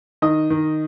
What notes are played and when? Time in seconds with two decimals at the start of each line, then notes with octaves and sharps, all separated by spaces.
0.22 D#3 D#5 D#6
0.50 D#3